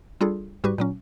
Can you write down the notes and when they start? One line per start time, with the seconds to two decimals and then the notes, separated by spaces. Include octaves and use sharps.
0.21 G3 D4 F4 G#4 A4
0.64 G#2 G3 F#4 G4 B4 C#6
0.78 A#2 F#3 C#4